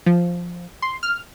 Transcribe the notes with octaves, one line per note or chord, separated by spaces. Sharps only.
F3
C6
F6